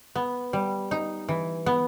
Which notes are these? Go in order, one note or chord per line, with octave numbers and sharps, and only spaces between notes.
B3
G3
D#4
E3
B3